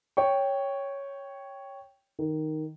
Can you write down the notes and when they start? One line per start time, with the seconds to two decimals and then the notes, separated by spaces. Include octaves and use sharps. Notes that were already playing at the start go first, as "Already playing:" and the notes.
0.17 C#5 G5 C#6
2.19 D#3